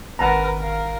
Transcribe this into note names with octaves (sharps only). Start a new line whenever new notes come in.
G#1 A#4 B4 F#5 A5 A#5
A#4 F5